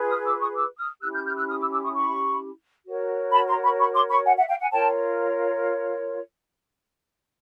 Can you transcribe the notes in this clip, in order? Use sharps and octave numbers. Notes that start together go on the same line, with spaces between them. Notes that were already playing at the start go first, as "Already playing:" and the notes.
Already playing: F4 G#4 B4
D#6 F6
D6 E6
C#6 D#6
D6 E6
D#6 F6
C#4 E4 G4 E6 F#6
F6 G6
F6 G6
E6 F#6
D#6 F6
D6 E6
D6 E6
C#6 D#6
B5 C#6
F#4 A#4 C#5
A5 B5
A#5 C6
B5 C#6
B5 C#6
C6 D6
B5 C#6
F#5 G#5
E5 F#5
F5 G5
F#5 G#5
F4 A#4 C#5 G5 A5